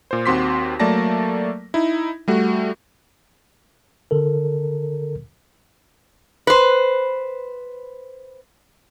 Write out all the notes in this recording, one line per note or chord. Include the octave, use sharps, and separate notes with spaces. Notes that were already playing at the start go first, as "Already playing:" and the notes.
A#2 C5
D#2 C4 F#4 C6 D6 B6
F#3 A3 A#3 D5 A5 A#6
D#4 E4
G3 A3 F#4
D3 A4 A#4
B4 C5